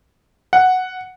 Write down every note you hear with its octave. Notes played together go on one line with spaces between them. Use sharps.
F#5